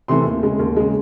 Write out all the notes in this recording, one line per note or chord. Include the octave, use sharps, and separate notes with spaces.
C3 E3 A3 C6
D#2
C#3 G#3
D#2
C#3 G#3